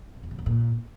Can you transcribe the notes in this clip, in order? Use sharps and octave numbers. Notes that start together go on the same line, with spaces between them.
C3
E2
C3
E2
A#2